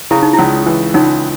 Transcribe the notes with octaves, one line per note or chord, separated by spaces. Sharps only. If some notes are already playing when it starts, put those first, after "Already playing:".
C#3 E4
D#4
E4
C#2
E3
C#2 D#4